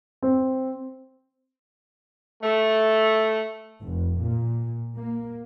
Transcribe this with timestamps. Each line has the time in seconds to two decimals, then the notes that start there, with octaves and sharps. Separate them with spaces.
0.23 C4
2.42 A3
3.82 F1
4.21 A#2
4.97 A#3